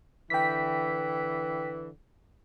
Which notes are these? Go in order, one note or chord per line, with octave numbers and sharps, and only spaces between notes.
D3 E3 G5 B6